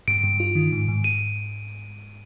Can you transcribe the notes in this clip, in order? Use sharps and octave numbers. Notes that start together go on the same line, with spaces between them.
G2 D7
G2
F4
D#3
G#2
G#2
D#7